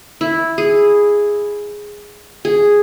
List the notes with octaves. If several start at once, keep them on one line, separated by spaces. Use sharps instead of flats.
E4
G#4
G#4